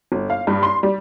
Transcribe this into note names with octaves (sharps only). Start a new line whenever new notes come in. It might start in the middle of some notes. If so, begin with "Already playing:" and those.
G1
F5
G2
C6
G3